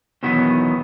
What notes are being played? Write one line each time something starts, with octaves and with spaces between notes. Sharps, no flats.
E2 B2 D#3 F#3 B3